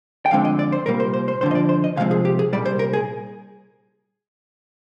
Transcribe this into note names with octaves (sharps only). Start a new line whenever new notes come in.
G5
F2 D3 G#3 C4 F5
D#5
D5
C5
C2 A#2 G3 A#3 A#4
C5
C5
C5
F2 D3 F3 C5
D#5
D5
C5
D#5
C2 C3 F3 G#3 C4 F5
G#4
G4
G#4
C2 A#2 G3 D5
C5
A#4
G#4